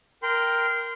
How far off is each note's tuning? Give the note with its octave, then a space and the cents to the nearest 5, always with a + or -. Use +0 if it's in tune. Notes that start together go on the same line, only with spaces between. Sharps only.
A#4 +0 G5 +0 C6 -25